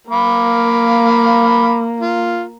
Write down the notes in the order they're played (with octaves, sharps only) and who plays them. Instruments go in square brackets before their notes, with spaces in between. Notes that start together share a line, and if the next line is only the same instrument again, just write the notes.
[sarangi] A#3 [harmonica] F5 B5 D6
[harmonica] F4